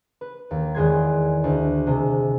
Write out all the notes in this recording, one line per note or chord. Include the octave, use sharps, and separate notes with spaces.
B4
D#2
E2 D#3 G#3 C6 G#6
D2
C3 G#3